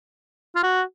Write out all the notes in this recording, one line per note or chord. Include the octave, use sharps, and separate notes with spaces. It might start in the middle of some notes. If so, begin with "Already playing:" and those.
F4
F#4